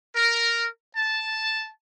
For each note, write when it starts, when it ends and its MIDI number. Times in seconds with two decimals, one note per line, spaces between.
0.16 0.67 70
0.95 1.69 81